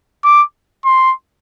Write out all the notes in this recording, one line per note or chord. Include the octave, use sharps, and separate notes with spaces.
D6
C6